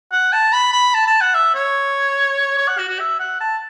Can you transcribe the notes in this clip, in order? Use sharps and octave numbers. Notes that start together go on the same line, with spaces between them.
F#5
A5
B5
B5
A5
A5
F#5
E5
C#5
C#5
F#5
F#4
F#4
E5
F#5
A5